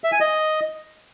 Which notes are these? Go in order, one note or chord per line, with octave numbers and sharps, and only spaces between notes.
E5
G#5
D#5